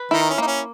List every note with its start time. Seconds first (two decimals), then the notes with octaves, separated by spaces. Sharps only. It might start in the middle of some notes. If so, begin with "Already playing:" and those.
Already playing: B4
0.11 D#3 D#4 E4
0.30 C#4
0.38 A#3 D#4
0.47 C#4